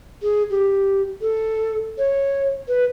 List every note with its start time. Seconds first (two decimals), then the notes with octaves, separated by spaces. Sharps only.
0.23 G#4
0.50 G4
1.22 A4
1.98 C#5
2.68 B4